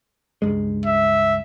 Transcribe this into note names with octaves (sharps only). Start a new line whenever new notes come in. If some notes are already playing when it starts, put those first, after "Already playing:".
C#2 G2 G#3
E5